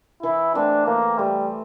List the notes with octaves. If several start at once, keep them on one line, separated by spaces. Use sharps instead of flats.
E3 E4
A3 C4 D4
E3 A#3
G3 A3 C4